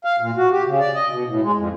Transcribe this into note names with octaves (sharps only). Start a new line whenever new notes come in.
F5
A#2
F#4
G4
C#3
D5
D#5
B2
A2
G#3
F2